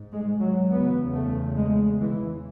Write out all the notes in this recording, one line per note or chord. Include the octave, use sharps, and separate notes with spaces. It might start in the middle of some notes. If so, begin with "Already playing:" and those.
Already playing: G#2
G#3
F#3
E2 C#3 B3
A3
G#3
E3